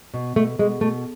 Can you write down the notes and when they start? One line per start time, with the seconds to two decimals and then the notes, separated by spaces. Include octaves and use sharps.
0.14 B2
0.36 B2 A3
0.59 B2 G#3
0.81 B2 A3